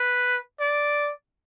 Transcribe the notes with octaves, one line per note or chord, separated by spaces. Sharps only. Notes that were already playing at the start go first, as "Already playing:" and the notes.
Already playing: B4
D5